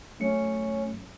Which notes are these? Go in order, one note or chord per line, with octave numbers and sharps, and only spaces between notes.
F#3 A3 C#4 C#7